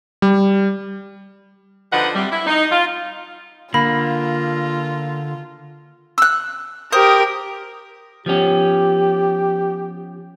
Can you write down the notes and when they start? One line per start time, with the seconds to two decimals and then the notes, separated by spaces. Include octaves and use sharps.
0.22 G3
1.93 D3 F3 D#4 B4 D#5 F#5
2.15 C3 G3
2.32 E4
2.46 D#4
2.72 F4
3.74 D3 A#3 F4 B5
6.18 E6 F#6
6.92 G4 A#4 C5 D#6
8.26 F3 B3 C#4 G4